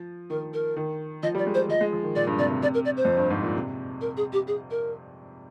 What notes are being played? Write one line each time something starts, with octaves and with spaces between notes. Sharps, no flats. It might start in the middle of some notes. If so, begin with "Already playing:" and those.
Already playing: F3
D#3 A#4
A#4
D#3
F3 D#5
G3 D5
G#3
C5
G3
F3 D#5
G#3
F3
D#3
A#2 D5
G2
C3 D5
C3
C3 D5
A#4
D5
C5
F2
G2
G#2
A#2
C3
A#4
G#4
G4
G#4
A#4